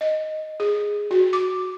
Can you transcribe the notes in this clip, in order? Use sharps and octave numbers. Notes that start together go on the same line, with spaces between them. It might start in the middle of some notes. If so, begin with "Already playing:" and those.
D#5
G#4
F#4
D6